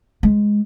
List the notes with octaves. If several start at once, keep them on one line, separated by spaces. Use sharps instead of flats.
G#3